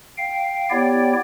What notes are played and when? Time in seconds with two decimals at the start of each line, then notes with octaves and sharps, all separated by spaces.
0.18 F5 G5
0.71 B3 E4 G4 C#5 D5 G5